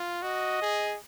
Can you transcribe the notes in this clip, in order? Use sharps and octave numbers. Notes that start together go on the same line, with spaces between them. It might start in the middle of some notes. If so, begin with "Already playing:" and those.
Already playing: F4
F#4 D#5
G#4